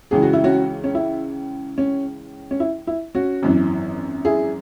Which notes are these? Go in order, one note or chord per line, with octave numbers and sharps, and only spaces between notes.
C#2 C#3 E3 G#4
F#4
E4
C#4 F#4
C#4
E4
C#4
C#4
E4
E4
C#4 F#4
G#1 F#2 E3
E4 G#4